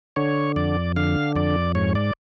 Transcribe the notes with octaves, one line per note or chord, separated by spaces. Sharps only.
D3 C#5
F2 D5
D3 F5
F2 D5
G#2 C#5
D5